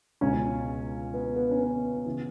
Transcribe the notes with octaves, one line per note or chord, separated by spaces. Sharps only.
C#2 B2 C#4
B3
B3
C#4
B3
C#3 E3